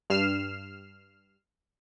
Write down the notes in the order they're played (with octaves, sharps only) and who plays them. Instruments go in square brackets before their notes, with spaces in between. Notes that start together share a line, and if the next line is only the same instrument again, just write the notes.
[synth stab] G2 F6 C7 E7